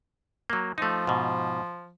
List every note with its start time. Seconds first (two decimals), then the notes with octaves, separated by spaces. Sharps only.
0.50 F#3 A#3
0.78 F3 A3 D#4
1.07 G#2 B2